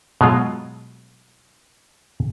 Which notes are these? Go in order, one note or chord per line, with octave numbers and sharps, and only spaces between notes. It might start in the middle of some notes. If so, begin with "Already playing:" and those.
B2 F#3 G#3 F4